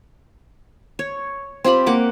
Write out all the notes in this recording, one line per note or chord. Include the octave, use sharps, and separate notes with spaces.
C#5
C4 F4 G4 B5
A#3 F#5 D6